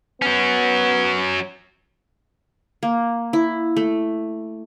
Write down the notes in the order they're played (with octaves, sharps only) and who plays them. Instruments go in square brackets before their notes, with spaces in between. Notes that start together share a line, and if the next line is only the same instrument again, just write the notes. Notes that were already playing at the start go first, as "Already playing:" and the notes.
[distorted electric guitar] F#3 C#4 [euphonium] B3
[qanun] A#3
E4
A3